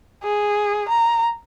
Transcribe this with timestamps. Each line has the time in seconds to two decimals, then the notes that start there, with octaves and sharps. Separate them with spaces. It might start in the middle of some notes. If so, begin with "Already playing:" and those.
0.23 G#4
0.89 A#5